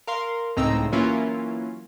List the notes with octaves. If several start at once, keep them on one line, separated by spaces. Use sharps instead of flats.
A#4 F5 C6
C#2 A2 C4 D#4 A#5 E6
E3 F#3 A#3 C#4 E4 F4